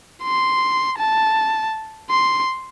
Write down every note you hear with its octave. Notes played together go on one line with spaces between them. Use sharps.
C6
A5
C6